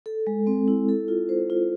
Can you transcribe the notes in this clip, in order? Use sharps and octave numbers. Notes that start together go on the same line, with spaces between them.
A4
G#3
C4
E4
A4
F4
C5
F4